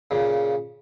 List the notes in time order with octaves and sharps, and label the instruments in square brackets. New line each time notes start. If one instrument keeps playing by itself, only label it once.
[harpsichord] A#2 C#3